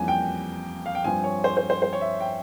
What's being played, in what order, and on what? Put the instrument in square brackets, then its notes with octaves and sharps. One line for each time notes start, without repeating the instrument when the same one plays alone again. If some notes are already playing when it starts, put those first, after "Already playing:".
Already playing: [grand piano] F2 E3 G3 A#3 C#4 G#5
G5
F5
G5
G2 F3 C4 G#5
C#5
C5
C5
C5
C5
C#5
E5
G5